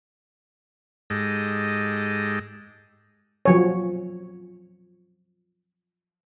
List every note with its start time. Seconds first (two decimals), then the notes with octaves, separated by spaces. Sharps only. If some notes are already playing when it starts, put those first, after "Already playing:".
1.10 G#2 G#3 G4 A4 D#5
3.45 F3 F#3 C#5